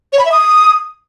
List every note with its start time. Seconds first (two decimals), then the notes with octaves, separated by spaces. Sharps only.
0.13 C#5
0.19 B5
0.25 E5
0.32 D#6